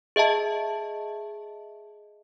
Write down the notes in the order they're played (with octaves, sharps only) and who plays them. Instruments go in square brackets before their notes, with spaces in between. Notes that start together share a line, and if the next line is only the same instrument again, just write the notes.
[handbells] G#4 D#5 E5 A5